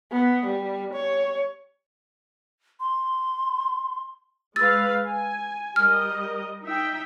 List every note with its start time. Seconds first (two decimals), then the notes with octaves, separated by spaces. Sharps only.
0.12 B3
0.46 G3
0.94 C#5
2.80 C6
4.56 G#3 B4 F5 E6 A6
5.05 G#5
5.76 G3 A#4 D#5 F6
6.63 D#4 E5 G5